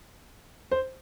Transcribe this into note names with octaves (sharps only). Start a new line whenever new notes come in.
C5